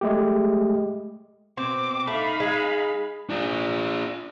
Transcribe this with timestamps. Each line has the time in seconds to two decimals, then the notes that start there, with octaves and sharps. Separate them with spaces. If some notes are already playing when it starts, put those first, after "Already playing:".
0.01 G#3 A3 G4
1.57 B2 C4 D6
2.07 A3 D#4 F5 B5
2.40 G#3
3.30 D4 F4